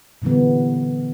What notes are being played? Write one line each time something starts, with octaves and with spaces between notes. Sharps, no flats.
A#2 D3 E3 G3 B3